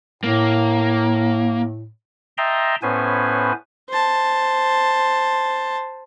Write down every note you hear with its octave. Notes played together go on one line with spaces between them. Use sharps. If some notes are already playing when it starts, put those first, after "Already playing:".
A2 A#3
D#5 E5 G5 A5 A#5 C6
A2 B3 C#4 B4 C5 G#5
C5 A5